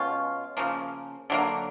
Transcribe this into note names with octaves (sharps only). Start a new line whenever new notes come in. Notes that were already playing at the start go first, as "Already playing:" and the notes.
Already playing: B2 G#3 C#4 F4
C#3 F3 A#3
D3 F#3 A#3